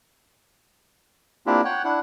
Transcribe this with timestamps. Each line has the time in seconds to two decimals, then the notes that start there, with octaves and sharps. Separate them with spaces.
1.47 A#3 C4 D4 E4 F4 G4
1.65 C#5 F#5 G5 F#6
1.85 D4 E4 F#5